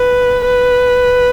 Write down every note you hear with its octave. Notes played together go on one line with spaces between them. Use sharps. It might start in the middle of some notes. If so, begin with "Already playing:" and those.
Already playing: B4
B4